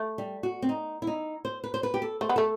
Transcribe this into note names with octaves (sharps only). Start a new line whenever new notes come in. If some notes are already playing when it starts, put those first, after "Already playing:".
Already playing: A3
G3
F#4
C4
D#4
E4
D#4
C5
B4
C5
B4
G4
A4
A3 C5
B3
A3 A4